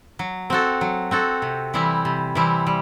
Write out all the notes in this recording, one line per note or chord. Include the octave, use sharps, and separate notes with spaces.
F#3
C4 F#4 A4
F#3
C4 F#4 A4
C3
E3 G3 C4 E4
C3
E3 G3 C4 E4
G3